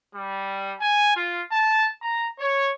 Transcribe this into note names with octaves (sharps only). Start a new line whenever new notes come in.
G3
G#5
F4
A5
A#5
C#5